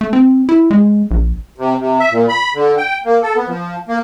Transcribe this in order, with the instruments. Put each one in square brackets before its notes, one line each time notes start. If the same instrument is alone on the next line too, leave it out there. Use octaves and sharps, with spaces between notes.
[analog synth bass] A3
C4
E4
G#3
A#1
[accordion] C3
C3
E5
A#2
B5
D3
G5
A#3
A4
B3
F3
A#3